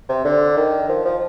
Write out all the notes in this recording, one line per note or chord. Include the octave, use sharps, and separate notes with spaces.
C3
D3
D#3
F3
F3